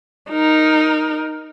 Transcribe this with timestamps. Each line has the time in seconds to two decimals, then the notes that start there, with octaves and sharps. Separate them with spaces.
0.30 D#4 A#4